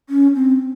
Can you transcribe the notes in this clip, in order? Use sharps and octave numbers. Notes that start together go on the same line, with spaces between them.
C#4
C4